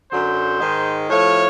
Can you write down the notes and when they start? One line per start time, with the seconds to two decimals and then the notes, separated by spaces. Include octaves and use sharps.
0.11 F#2 D3 F#3 C5
0.60 G#2 D#3 G#3
1.09 A2 F3 A3 C#5